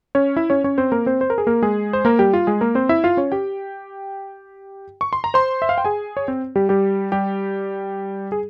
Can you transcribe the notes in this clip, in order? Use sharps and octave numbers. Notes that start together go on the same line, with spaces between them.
C#4 C#5
E4 E5
C#4 C#5
C#4 C#5
C4 C5
A#3 A#4
C4 C5
C5
A#4
G#4
A#3 A#4
G#3 G#4
C5
A#3 A#4
G3 G4
F4
G#3 G#4
A#3 A#4
C4 C5
E4 E5
F4 F5
C#4 C#5
G4 G5
C#6
C6
A#5
C5 C6
E5
F5
G5
G#4 G#5
C#5
C4 C5
G3 G4
G3 G4
G3 G4
G#4